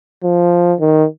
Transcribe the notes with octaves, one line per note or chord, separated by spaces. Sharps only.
F3
D#3